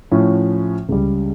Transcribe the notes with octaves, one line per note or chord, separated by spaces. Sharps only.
A2 F3 C#4
C#2 C#3 G3